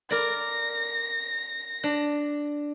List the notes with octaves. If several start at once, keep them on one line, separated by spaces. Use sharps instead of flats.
A#4 D5 A#6
D4